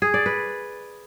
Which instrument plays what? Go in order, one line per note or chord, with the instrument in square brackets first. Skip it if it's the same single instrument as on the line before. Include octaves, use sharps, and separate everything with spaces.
[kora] G#4
D5
B4